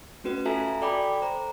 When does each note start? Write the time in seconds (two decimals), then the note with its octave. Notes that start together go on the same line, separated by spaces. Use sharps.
0.24 A3 C#4 F#4 B4
0.45 F4 F#4 A4 E5 G#5 A#5
0.82 A4 D5 G5 B5 D6
1.22 C5 A#5